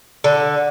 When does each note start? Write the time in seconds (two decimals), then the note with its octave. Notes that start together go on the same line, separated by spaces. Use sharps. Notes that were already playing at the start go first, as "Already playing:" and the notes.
0.24 D3